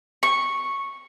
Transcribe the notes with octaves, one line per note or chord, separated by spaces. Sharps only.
C#6